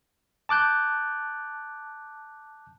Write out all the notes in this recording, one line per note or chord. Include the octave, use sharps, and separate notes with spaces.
A5 D6 F#6 G6